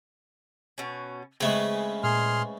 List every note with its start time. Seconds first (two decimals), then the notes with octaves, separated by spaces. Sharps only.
0.78 B2 C#4
1.41 C#3 G#3 A3 C4 B4
2.03 A#2 G#4 C6 F6